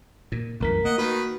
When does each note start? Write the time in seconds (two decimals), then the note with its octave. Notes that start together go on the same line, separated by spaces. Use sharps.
0.32 A#2
0.60 C2 F#2 E3 A3 A#4 B6
0.85 A#3 D#5 F#5
0.98 D#3 F#4 B4